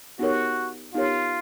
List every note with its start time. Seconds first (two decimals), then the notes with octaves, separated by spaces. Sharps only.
0.19 B3 D#4 F#4 G4 A#4 C#5
0.93 B3 D#4 F4 G4 A#4 C#5